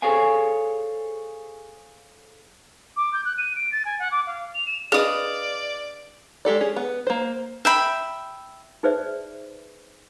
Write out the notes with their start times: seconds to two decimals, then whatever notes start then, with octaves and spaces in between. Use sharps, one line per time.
0.02 G#4 A4 C5 C#5 F5 G#5
2.96 D6
3.13 G6
3.25 F#6
3.38 D#7
3.56 D7
3.72 A6
3.85 G#5
3.99 F#5
4.11 D6
4.27 F5
4.54 F7
4.67 E7
4.92 D4 G#4 B4 D5 D#5 F5 D#6
6.45 G#3 G4 A4 D5
6.60 C#4 G#4
6.76 B3
7.07 A#3 C5
7.65 E5 G5 B5
8.83 D#4 G#4 B4 C5 D5 E5